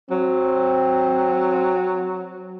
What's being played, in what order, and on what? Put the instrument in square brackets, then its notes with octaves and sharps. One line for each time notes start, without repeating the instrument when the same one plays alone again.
[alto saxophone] F#3 [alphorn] C4